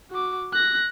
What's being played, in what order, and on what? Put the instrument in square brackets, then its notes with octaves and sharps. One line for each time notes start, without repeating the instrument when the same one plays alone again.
[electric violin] F#4 D6
F#6 A#6